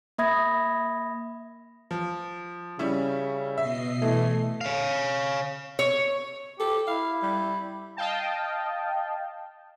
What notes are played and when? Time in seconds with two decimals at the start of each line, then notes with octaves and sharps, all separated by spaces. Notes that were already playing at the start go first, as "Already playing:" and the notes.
0.18 A#3 E5 B5 D#6 G#6 A#6
1.91 F3
2.79 C#3 G3 C#4 E4
3.58 B2 D#5 E5 C7
4.02 E3 A3
4.61 C#5 F5
5.79 C#5
6.60 G4 A4
6.87 E4 F5
7.23 G3
7.97 D#5 F5 G5 A5